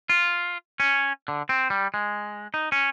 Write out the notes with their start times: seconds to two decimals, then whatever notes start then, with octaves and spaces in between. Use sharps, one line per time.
0.10 F4
0.80 C#4
1.28 D3
1.49 C4
1.70 G3
1.94 G#3
2.54 D#4
2.72 C#4